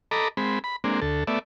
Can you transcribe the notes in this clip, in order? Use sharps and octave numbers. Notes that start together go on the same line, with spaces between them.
A4 D#5 A#5 B5 D6
G#3 C4 B5
B5
G#3 A#3 C4 D4
D2 A4
A3 B3 D5 E5